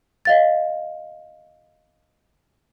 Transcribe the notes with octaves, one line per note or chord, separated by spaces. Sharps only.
D#5 F5 A6